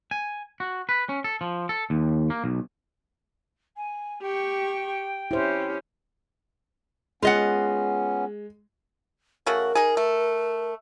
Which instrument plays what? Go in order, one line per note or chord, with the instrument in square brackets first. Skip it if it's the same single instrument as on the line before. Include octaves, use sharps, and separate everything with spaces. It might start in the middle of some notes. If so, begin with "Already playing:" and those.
[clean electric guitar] G#5
F#4
B4
C#4
A4
F3
A4
D#2
A#3
B1
[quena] G#5
[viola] G4 C#6 [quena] G5
[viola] C#4 G4 [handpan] E4 C5
[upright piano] G#3 [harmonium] B3 C#4 [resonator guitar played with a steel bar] F4 D#5 F#5
[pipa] C#3 A3 F#4 [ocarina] A#4
[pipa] D#4 G#4
A3